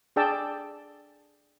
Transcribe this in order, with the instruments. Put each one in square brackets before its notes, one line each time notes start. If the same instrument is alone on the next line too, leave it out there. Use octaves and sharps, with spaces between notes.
[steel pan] D4 G#4 D5 G5 A5 E6